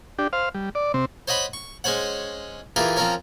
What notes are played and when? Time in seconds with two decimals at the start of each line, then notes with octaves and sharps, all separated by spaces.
0.19 D4 G4
0.33 C5 F5
0.54 G3
0.75 D5
0.94 C3 C4
1.28 C5 C#5 D#5 F#5 B5
1.53 C#6
1.84 G#3 C#4 C5 C#5 F#5
2.76 E3 F4 G4 G#4 A#4
2.97 F3 C4 C#4 A#4 C#5